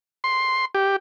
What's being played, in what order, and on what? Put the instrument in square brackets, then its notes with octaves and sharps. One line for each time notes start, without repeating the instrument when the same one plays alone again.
[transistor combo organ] C6
G4